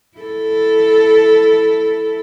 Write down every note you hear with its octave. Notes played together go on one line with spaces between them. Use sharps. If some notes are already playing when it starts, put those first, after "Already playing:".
E4 A4